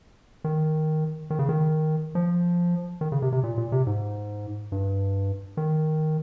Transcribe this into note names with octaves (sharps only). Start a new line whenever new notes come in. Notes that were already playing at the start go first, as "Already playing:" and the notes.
D#3
D#3
C#3
D#3
F3
D#3
C#3
C3
C3
A#2
A#2
C3
G#2
G2
D#3